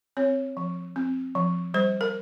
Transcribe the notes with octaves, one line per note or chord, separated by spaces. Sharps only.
C4 C#5
F3
C4
F3
G3 C5
A#4